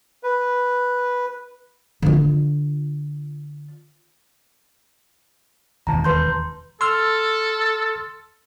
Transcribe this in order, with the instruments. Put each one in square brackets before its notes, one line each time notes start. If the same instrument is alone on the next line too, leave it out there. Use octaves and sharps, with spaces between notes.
[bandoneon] B4
[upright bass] D3 F4
[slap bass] E1 D#2 B2 [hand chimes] A5 A#5
[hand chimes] B4 C6 G6
[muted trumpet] A4 [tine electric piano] C6 E6 F6